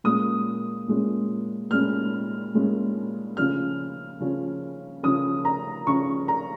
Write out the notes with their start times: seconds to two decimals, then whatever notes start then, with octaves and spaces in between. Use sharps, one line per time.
0.04 A#2 G#3 C#4 D#6
0.88 A#2 G#3 C#4
1.71 A#2 G#3 C#4 F6
2.54 A#2 G#3 C#4
3.37 C#3 F3 C#4 F6
4.20 C#3 F3 C#4
5.03 C#3 F3 C#4 D#6
5.45 A#5
5.87 C#3 F3 C#4 C#6
6.28 A#5